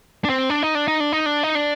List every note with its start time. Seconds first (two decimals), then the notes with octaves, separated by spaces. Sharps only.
0.25 D4
0.29 C4
0.50 D4
0.63 D#4
0.75 D4
0.88 D#4
1.00 D4
1.12 D#4
1.26 D4
1.43 D#4
1.55 D4